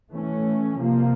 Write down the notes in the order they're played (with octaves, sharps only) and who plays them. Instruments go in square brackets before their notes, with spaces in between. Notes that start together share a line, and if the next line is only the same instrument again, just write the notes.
[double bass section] E3 A3 C#4
C3 F3 A#3